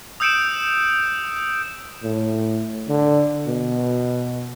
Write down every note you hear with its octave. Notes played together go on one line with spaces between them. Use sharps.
D#6 E6 G6 C#7 D7 E7
A2
D3
B2